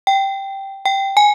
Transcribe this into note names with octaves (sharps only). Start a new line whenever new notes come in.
G5
G5
G#5